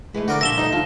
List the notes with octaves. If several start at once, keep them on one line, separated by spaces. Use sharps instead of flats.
E3 G#3 A3
D3 F#4 A#4 D5
A#2 F3 G3 E5 A#6 E7 G7
D2 D#4
D3 F3 F4